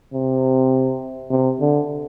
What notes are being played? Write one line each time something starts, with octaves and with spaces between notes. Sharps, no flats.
C3
C3
D3